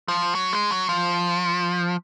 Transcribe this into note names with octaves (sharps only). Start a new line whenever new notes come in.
F3
F#3
G#3
F#3
F3